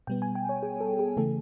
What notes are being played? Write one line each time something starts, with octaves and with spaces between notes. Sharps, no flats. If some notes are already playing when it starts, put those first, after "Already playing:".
B2 G3 B3 G5
G#5
G5
C#5
G#4
A4
G#4
C#3 E3 A3 A4